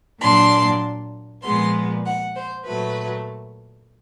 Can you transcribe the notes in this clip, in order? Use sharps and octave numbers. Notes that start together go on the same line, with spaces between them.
A#2 F#3 A#3 D4 C6
A#2 F3 G#3 B3 C6
F#5
C5
A#2 F#3 A3 B4